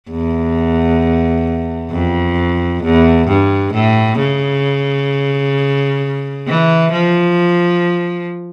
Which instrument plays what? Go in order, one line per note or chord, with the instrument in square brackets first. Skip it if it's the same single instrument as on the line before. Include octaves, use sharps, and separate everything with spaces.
[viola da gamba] E2
F2
E2
G2
A2
C#3
E3
F3